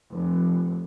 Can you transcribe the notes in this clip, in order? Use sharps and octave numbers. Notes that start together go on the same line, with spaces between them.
F1